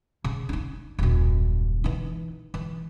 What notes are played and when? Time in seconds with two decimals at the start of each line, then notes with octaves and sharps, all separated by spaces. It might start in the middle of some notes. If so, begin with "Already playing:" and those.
0.24 C#3
0.49 D4 D#4
0.99 D#1 F#2
1.84 E3 D#4
2.54 E3